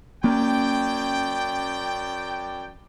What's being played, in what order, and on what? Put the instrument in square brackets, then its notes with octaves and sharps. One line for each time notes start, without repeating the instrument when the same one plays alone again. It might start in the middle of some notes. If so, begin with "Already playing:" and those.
[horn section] F#2 D5 G5 [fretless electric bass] A#3 C#4